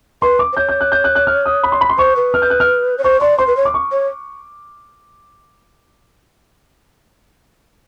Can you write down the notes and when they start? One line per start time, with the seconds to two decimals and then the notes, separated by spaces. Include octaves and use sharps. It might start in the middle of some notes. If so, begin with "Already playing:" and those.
0.22 B4 C6
0.39 D6
0.53 C5
0.57 C#5 G6
0.69 G6
0.81 F#6
0.92 G6
1.04 F#6
1.15 F#6
1.27 F6
1.46 D#6
1.63 B5
1.72 C6
1.81 B5
1.89 C6
1.98 C5 C#6
2.16 B4
2.34 F6
2.42 G6
2.50 F#6
2.60 F6
2.98 C#5
3.04 C5 C#6
3.21 D5 C6
3.38 C5 C6
3.47 B4
3.57 C#5
3.65 D6
3.74 C#6
3.92 C#5